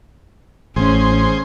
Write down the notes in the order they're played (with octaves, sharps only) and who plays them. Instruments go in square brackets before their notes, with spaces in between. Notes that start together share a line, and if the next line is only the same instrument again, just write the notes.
[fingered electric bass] A1 [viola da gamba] C#4 [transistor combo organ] G#4 C5